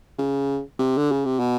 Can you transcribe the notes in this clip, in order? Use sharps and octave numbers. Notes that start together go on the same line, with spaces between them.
C#3
C3
D3
C#3
C3
B2